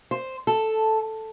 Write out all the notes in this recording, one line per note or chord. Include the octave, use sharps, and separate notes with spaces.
C5
A4